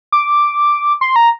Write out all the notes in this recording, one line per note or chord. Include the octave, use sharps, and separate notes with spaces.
D6
C6
A#5